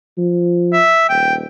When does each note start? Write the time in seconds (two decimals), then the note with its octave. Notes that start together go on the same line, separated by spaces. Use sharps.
0.18 F3
0.73 E5
1.10 D#1 G5